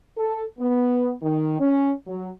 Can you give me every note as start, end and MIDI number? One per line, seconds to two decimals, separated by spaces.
0.17 0.43 69
0.59 1.11 59
1.22 1.59 51
1.60 1.91 61
2.07 2.28 54